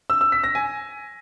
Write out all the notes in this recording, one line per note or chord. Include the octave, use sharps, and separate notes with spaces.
E6
E6
B6
A#6
G#5